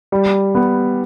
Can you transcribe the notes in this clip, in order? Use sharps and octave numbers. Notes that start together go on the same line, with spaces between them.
G3
B3